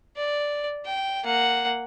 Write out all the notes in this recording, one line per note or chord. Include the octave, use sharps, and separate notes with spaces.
D5
G5
A#3 F#5